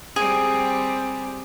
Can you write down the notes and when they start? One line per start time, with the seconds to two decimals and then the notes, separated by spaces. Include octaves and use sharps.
0.16 G3 C4 G#4